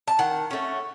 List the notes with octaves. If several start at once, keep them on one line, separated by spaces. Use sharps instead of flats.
A5
D#3 F#5
A3 C#4